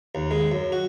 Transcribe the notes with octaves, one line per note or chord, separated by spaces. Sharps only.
D#2
G#3
F#2
F#4